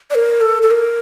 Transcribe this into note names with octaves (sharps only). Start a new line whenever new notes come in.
D5
A#4
A4
A4
A#4